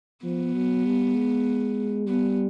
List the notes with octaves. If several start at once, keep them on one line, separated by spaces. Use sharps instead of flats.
F3 B3
F#3
G3
G#3
G3 B3